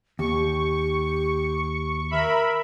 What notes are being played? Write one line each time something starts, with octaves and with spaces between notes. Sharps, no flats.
D#2 G4 C#6
A#4 E5 B5